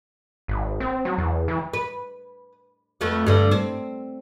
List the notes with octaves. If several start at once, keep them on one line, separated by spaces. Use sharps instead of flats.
G#1
C4
F#3
E2
E3
B4
F2 A3 B3
G2 D3
C4